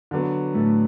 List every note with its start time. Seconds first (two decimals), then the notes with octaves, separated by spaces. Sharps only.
0.11 D3 F#3 B3
0.54 A2 A3